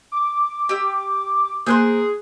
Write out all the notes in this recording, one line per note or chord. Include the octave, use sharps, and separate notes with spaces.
D6
G4 E6
A#3 G#4 C5 C6 F#6 G6